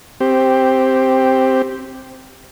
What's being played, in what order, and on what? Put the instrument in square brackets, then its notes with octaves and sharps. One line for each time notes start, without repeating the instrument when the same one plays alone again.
[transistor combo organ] C4 G4